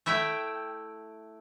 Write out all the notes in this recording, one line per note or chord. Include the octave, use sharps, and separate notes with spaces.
A3 E4 E5 G5